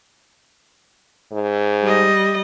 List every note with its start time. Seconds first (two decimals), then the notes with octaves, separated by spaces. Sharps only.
1.32 G#2
1.83 G3 D#5